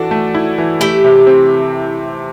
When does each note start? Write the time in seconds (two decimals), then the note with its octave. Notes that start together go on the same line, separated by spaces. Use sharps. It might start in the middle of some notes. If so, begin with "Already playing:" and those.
Already playing: E3 D4 F#4 A4
0.11 A3
0.35 E4
0.58 E3
0.80 A3 E4 G4
1.04 C3
1.27 C4